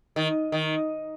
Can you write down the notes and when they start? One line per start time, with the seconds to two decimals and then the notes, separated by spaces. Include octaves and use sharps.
0.16 D#3
0.52 D#3